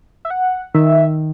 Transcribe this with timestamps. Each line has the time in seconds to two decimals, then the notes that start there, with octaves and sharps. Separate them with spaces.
0.25 E5
0.30 F#5
0.74 D#3 E5